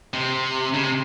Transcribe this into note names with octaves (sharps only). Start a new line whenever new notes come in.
C3
C#3
C3